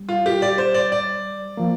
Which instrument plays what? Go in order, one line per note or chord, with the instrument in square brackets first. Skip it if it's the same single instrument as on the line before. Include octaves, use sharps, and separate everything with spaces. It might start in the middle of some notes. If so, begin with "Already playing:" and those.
Already playing: [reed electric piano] G3
[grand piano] F4
G4
D5
C5
D5
D5
[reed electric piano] F3 A#3